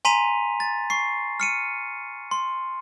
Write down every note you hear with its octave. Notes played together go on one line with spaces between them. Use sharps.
G#5 A#5 C6 B6 D#7 F7
A6
C#6 C7
F6 C#7 D#7
C6